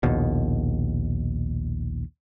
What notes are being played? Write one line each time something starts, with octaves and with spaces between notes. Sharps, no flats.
A#1 D#2 B2